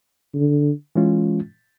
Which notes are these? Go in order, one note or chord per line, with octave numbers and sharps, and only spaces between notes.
D3
E3 G#3 C#4 F4